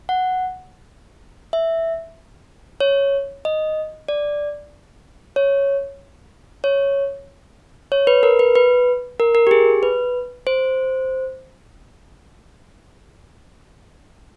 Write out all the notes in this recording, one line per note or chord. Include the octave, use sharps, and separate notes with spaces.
F#5
E5
C#5
D#5
D5
C#5
C#5
C#5
B4
A#4
B4
B4
A#4
A#4
G4
G#4
B4
C5